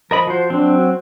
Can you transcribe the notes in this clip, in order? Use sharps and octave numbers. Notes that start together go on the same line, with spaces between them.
F3 A#4 D#5 B5
F3 F#4 C5
F#3 C4 D4
F#4